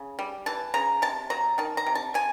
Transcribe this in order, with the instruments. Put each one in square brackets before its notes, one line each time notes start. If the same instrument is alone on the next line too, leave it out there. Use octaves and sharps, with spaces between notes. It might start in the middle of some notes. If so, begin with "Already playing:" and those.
Already playing: [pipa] C#3
G3
E3 A5
C#3 A#5
C3 A5
F#3 A#5
D#3 A5
A#5
C3
A5
C3 G#5